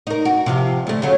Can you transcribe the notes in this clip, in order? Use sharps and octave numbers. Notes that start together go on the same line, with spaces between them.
D#4 A#4
F#4
C3 F3 F4
D2 A3
C#3 F#3 A3